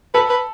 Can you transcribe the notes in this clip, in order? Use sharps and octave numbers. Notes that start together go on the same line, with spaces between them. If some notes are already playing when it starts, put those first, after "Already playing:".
A4 B4
B4